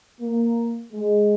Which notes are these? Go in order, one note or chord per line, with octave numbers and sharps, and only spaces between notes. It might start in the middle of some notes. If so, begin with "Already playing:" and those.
A#3
G#3